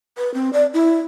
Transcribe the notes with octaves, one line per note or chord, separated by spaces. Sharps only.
B4
C4
D5
E4